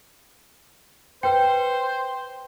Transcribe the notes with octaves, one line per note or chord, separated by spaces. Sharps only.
B4 C5 G5